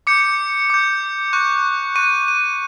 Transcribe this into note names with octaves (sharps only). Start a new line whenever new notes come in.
D6 G6 C#7
D6 G6
C#6 F#6
C#6 F#6 D#7
D#7